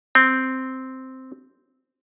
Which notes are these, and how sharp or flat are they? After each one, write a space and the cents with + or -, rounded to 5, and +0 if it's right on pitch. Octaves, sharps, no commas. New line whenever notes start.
C4 -5